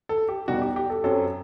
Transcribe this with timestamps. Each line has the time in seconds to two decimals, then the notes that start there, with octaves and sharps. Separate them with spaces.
0.09 A4
0.28 G4
0.48 E2 B2 G3 D#4 F#4
0.62 G4
0.76 G4
0.90 A4
1.04 F#2 F#3 C4 A4